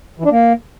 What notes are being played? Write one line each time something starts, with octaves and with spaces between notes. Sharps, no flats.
E3
D4
A#3